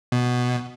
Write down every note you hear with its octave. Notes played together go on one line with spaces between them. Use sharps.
B2